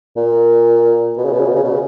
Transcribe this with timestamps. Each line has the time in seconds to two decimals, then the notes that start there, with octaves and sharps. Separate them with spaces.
0.16 A#2
1.17 B2
1.25 C#3
1.32 B2
1.40 C#3
1.48 B2
1.56 C#3
1.64 B2
1.71 C#3